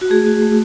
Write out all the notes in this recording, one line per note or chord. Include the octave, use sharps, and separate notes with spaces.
F#4
A3 G#4
F#4
A3